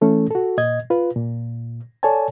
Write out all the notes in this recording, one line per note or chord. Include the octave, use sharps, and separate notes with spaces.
E3 A3 C#4 A4
F#4 A4
A#2 D#5 G#6
F4 B4
A#2
A4 C#5 D5 G#5 A5